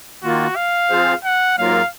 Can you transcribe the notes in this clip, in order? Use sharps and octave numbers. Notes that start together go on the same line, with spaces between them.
D#3 A#3 F4 F#4
F5
F3 C4 F4 G#4 C5
F#5
G#2 F#3 A#3 F4 A#4 F5